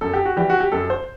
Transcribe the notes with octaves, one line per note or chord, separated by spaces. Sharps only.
F#2 A4
G4
F#4
E3 G3 G4
F#4
G4
F#2 A4
C5